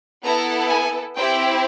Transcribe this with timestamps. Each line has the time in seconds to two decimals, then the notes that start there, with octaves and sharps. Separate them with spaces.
0.23 B3 E4 A4 A#5
0.69 G#5
1.15 C4 E4 G4 G5